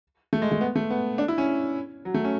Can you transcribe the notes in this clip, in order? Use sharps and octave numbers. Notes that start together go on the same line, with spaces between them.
A3
G#3
A3
B3
A3
B3
D4
E4
C#4
F#3
A3
C#4